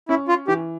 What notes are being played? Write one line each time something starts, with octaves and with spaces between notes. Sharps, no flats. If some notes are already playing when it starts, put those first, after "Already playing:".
C#4 E4
F4
E3 G4